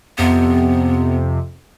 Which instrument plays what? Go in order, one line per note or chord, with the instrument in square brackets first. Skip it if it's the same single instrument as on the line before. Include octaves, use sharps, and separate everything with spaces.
[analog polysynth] F2 C3 [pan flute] B3